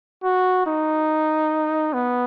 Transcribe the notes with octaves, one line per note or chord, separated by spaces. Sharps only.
F#4
D#4
B3